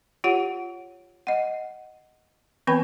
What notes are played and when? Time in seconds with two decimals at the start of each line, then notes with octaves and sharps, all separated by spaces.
0.24 F4 G4 C#5 F#5
1.27 D#5 F#5
2.67 E3 B3 C4 B4 G5 B5